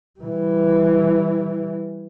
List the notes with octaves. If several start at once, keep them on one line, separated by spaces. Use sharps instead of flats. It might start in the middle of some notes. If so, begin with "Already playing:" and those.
E3 G3